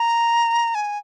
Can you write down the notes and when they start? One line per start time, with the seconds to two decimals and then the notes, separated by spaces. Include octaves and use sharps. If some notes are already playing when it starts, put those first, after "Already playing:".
Already playing: A#5
0.75 G#5